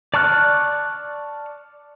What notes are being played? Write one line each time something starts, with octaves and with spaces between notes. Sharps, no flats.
D5 A5 C#6 F6 F#6